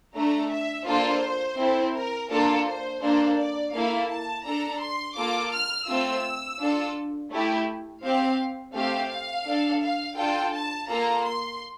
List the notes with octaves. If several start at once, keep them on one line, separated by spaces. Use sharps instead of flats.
A3 D4 A4 A#5
E5
A#3 D4 F4 A4 C5
C4 E4 A4
A#4
A#3 D4 F4 A4 A#4
C5
A#3 D4 A4 C5
D5
A#3 E4 A4 F5
A5
D4 A4 A#5
C6
A#3 F4 A4 D6
F6
A3 C4 F4 E6
D4 F4 A4
A3 E4 G4
C4 G4 F5
A3 C4 G4 F5
F5
D4 A4
F5
D4 F4 A4 G5
A5
A#3 F4 A4 A#5
C6